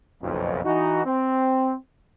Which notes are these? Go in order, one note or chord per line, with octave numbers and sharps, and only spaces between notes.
F#1 B1 F2
E3 D#4 F#4
C4